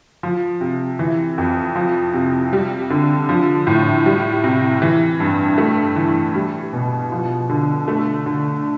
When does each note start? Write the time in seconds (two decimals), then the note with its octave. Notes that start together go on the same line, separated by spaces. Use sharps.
0.23 F3
0.61 C3
0.99 E3
1.38 F2
1.75 F3
2.14 C3
2.53 G3
2.90 D3
3.29 F3
3.67 A2
4.06 G3
4.44 C3
4.82 E3
5.20 G2
5.58 A3
5.96 E3
6.35 G3
6.73 B2
7.12 F3
7.49 D3
7.88 A3
8.26 D3